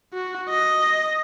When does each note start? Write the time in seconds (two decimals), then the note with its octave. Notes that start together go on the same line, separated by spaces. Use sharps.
0.14 F#4
0.50 D#5